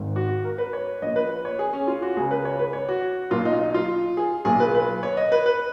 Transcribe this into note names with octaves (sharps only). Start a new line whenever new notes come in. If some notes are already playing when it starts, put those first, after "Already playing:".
Already playing: G#1 G#2 D#3
F#4
A#4
B4
C#5
A#1 A#2 D#5
B4
C#5
G#4
C#4
F4
F#4
C#2 C#3 G#4
B4
C#5
B4
C#5
F#4
B1 A#2 F4
D#4
D#4
F4
G#4
B1 A#2 G#4
B4
B4
C#5
D#5
B4
B4